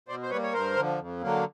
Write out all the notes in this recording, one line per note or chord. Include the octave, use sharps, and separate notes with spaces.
B2 C5 D5
C5
G3 A#3 B4 C#5
C#5
G2 A#4 C5
D3 F3
F2
D3 F#3 A#3